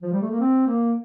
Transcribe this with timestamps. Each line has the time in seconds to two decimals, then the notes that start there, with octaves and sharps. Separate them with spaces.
0.02 F3
0.12 G3
0.22 A3
0.31 A#3
0.40 C4
0.67 A#3